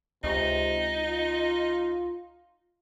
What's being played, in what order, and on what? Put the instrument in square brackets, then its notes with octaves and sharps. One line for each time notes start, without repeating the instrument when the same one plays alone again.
[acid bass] C#2 [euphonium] C3 [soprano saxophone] D#4
[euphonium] F4